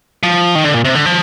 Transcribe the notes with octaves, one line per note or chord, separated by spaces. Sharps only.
F3
D#3
D3
A#2
C3
D3
F3